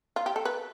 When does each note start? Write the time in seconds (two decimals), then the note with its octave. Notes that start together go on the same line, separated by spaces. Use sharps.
0.16 F4
0.26 G4
0.36 A4
0.45 B4